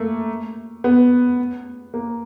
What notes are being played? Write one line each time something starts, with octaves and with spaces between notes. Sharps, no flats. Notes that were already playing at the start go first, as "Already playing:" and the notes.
Already playing: A3 A#3
B3
A#3